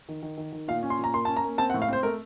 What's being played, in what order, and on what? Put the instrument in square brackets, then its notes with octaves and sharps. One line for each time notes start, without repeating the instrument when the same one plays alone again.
[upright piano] D#3
D#3
D#3
D#3
A#2 F5
C#4
C6
A#2 A#5
A#3 C6
C#4 A5
A#5
A#3
C4 A5
F#5
A2
F5
C4 C5
A3 A#4